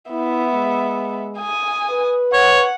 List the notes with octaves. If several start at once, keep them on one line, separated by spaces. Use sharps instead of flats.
B3 E4 E5
G#3
G#5 D#6
B4
C#5 F#5